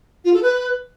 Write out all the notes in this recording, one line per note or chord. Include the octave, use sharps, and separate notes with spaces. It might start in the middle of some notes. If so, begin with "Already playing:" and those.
F4
A4
B4